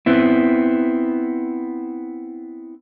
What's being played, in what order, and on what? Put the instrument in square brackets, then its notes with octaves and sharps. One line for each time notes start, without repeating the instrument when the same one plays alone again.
[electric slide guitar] B3 C4 E4